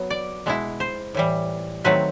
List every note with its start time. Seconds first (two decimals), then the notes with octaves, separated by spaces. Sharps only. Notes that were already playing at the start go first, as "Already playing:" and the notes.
Already playing: F#3 B3
0.10 D5
0.46 B2 G#3 B3 E4
0.80 C5
1.15 A2 E3 G3
1.84 D#3 F#3 A3 C4 B4